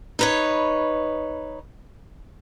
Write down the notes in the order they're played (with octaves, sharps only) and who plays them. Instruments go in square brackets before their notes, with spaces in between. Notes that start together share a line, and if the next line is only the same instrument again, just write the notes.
[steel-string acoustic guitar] D#4 B4 C#5